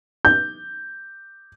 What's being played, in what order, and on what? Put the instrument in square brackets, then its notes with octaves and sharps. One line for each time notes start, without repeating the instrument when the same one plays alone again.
[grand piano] G6